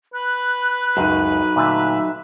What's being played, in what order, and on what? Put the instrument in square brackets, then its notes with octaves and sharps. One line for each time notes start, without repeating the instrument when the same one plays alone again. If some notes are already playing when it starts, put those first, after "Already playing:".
[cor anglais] B4 [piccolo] F#6
[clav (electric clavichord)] C#2 F#2 [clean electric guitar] F#3 D#4
[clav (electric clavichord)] A#2 D3 A3 [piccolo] E5